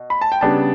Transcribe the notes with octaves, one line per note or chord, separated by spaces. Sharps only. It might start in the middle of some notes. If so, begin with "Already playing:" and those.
Already playing: B2
B5
A5
G5
C#3 G3 B3 D4 A5